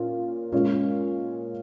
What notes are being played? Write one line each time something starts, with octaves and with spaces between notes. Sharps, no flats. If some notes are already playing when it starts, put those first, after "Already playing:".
Already playing: A#2 C#4 F4
A#2 G#3 C#4 F4